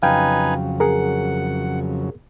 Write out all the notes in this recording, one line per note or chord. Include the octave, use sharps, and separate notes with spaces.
F2 C#3 F#3 D#4 B4 F5 G5 G#5
G#4 A#4 F#5